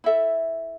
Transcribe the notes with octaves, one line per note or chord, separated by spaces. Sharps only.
E4 A4 E5